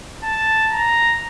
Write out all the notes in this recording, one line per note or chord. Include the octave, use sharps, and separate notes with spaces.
A5
A#5